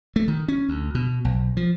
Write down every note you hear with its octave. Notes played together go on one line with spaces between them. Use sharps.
A3
D#3
C#4
D2
B2
B1
F3